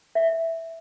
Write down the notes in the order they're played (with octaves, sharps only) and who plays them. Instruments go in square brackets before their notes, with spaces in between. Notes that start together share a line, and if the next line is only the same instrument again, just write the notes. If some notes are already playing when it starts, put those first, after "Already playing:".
[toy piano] E5